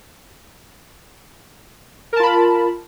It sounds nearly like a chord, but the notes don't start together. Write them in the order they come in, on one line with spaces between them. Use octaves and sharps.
A#4 A5 F4 B5